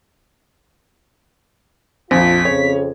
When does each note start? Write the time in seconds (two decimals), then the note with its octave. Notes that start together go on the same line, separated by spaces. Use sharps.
2.11 A#1 F2 C4 F4 B6
2.45 F2 C#3 C#5